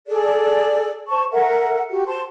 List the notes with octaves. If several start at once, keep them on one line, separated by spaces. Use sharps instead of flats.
G#4 A4 D5
C5 A5 C#6
A4 A#4 E5 F#5
F#4 G4
C5 A5 C6